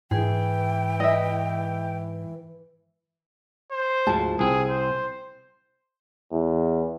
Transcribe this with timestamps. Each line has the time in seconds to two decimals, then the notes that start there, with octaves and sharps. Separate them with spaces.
0.11 G#2 E3 G#4 G5
1.00 D#5 E5
3.72 C5
4.07 D2 G#2 F3 A5
4.39 C2 C4 G#4
4.70 C5
6.32 E2